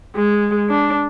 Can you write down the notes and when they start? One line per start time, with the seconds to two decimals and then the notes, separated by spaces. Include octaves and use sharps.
0.15 G#3
0.69 D4